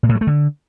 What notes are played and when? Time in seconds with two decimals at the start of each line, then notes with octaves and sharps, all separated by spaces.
0.03 A#2
0.09 A2
0.15 F#3
0.21 A3
0.27 D3